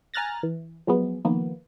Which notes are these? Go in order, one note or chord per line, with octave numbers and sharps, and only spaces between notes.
G#5 A#5 F6 F#6 A6 A#6
E3
F3 F#3 G#3 B3
D#3 F3 A#3 B3